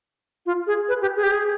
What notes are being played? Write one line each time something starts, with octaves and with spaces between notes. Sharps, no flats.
F4
G#4
B4
G4
G#4
G4
G#4